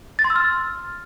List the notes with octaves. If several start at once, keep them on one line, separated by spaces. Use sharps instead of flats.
A6
C6
E6
F6